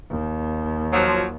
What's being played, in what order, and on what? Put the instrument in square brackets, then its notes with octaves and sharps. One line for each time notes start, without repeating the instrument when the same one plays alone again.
[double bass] D#2
[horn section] F3 F#3